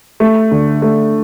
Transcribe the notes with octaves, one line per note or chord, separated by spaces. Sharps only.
A3
D3
A3